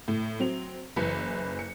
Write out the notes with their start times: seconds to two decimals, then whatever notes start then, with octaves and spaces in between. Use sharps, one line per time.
0.08 A2
0.40 F#3 C4 F7
0.96 F#1 E3 B4 C#7
1.59 C#7